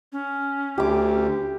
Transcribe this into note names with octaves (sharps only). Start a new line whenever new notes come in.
C#4
D2 G4 D6